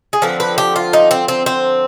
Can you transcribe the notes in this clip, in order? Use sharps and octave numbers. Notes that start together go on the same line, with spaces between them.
G#4
D3 F3 C4 B4
B4
G4
F4
D#4
C4
C4
C4